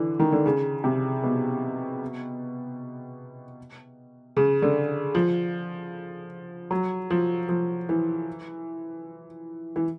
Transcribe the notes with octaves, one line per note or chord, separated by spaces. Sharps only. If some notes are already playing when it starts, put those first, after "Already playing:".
Already playing: D3 E3
D#3
D3
C#3
C3
B2
C#3
D3
F3
F#3
F3
F3
E3
E3